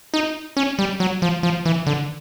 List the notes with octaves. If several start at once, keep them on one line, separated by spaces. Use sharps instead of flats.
D#4
C#4
G3
F#3
F3
F3
E3
D3